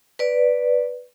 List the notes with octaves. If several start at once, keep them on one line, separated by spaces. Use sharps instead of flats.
B4 D5